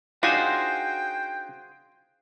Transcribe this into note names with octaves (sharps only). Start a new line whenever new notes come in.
D4 D#4 F4 F#4 G#4 C5 G5 G#5